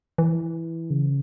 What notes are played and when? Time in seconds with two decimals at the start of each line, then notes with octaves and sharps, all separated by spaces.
0.18 E3
0.90 C#3